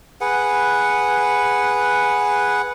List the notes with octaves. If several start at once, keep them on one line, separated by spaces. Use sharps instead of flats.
G#4 B4 F#5